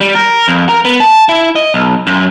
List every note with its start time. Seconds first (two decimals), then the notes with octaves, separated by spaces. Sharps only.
0.01 G3
0.15 A#4
0.48 F2
0.69 A#4
0.85 B3
1.00 A5
1.29 E4
1.56 D#5
1.74 B1
2.07 F#2